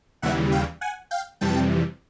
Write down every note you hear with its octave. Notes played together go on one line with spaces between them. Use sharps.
D#2 C#3 E3 G3 E5 F#5
F5 G5
F#5 G#5
F5 G5
F2 C3 E3 G3 G5 A5